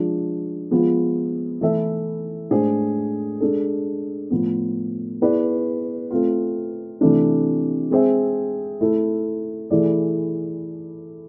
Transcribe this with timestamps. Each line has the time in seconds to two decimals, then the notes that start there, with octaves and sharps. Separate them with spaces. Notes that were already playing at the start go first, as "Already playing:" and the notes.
Already playing: F3 G#3 D4
0.71 F3 G#3 B3 F4
1.61 E3 A3 E4 A4 E5
2.51 A2 G#3 D4 G#4 C5
3.40 G#3 D4 A4
4.30 A2 F3 B3
5.21 B3 E4 G#4 B4 D5
6.11 A3 C4 F4
7.01 C3 E3 A3 D4
7.91 G#3 C4 G#4 C5 E5
8.81 A3 E4 A4
9.70 E3 A3 E4 G#4 D5